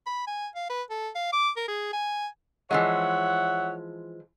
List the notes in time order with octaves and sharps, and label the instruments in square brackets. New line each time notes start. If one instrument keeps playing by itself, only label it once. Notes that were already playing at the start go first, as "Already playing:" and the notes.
[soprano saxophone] B5
G#5
F5
B4
A4
F5
D6
A#4
G#4
G#5
[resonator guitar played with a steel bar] E3 F3 G#3 [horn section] C#5 E5 F#5